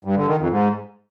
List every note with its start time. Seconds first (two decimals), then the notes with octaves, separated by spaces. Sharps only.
0.05 G2
0.16 D3
0.28 D#3
0.39 F2
0.51 G#2